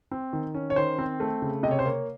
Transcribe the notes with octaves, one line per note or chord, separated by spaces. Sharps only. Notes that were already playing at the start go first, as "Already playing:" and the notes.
C4
D#3
C#4
C#5
D#3 C5
C4
A3
C#3
C3 D#5
C#5
C5
A#3 C#5